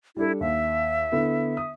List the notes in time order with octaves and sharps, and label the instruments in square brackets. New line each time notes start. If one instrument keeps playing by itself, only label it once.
[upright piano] G3 D4 A4 [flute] E4
[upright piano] D#2 [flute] E5
[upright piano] D3 B3 E4
D#6